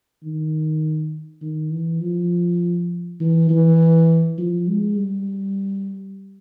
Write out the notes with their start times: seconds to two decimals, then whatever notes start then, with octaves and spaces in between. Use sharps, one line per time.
0.23 D#3
1.41 D#3
1.71 E3
2.01 F3
3.20 E3
3.49 E3
4.38 F3
4.68 G#3
4.96 G3